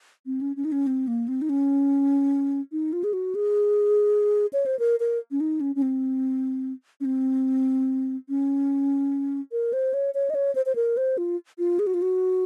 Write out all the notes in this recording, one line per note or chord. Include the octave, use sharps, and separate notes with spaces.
C4
C#4
C#4
D#4
C#4
C4
A#3
C4
D#4
C#4
D#4
F4
G#4
F#4
G#4
C#5
C5
A#4
A#4
C#4
D#4
C#4
C#4
C4
C#4
C4
C#4
A#4
C5
C#5
C#5
D#5
C#5
C5
C5
A#4
C5
F4
F4
G#4
F#4
F4
F#4